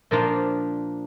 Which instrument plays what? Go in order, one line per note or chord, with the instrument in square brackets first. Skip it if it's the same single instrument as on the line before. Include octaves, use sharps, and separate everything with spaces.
[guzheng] A#2 F3 A#3 D4 F4